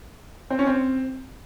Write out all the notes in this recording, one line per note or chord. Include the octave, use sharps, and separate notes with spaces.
C4
C#4
C4